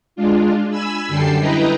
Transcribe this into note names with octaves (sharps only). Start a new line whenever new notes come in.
G#3 D4 F4
G#5 B5 E6
F#2 D3 G3 A4 G5 C7
E4 B4 D#5 G5 A#5